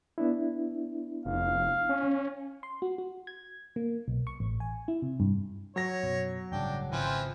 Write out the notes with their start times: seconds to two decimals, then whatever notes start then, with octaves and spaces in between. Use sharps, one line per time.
0.18 B3 D4 E4
1.25 F1 F5
1.89 C#4
2.63 C6
2.82 F#4
2.98 F#4
3.27 G#6
3.76 A#3
4.08 B1
4.27 C#6
4.40 A1
4.60 G#5
4.88 E4
5.02 C3
5.20 G2
5.76 F#3 C#5 A#6
6.03 F#2 B2
6.52 A1 G2 C#3 D4 G5
6.91 G#1 C#3 E3 F3 C4